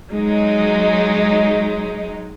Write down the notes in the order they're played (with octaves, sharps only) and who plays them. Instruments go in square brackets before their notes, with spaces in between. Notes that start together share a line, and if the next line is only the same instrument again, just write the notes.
[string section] F#3 G#3 D#4